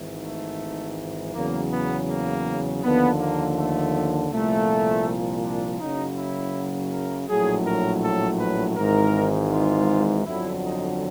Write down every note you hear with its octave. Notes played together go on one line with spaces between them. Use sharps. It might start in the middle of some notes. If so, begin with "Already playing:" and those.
Already playing: G#1 G#2 E3
A3
E2 C#3 F#3 A#3
B3
A#3
D#2 D3 F3 B3
A#3
A3
C2 A#2 F3 A3
D4
F#1 F#2 C#3 F#3 D#4
E4
A#4
A#1 A2 F#3 G#4
A#4
A4
B4
G#1 G#2 E3 A#4
F4
G1 F2 D3 F#3 E4
D#4